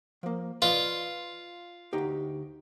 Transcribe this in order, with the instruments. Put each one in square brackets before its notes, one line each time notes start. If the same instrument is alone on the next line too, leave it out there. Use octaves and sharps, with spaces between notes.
[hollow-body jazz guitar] F3 A#3
[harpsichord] F4 [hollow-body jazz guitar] B4 D5 D#5
[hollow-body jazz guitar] D2 D#4 G4